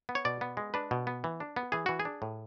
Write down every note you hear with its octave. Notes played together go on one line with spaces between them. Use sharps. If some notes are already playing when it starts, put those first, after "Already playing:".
B3
C#5
B2 D5
B3
G#3
D4 B4
B2
B3
E3
D4
B3
E3 G#4
E3 F#4
G#4
D4
A2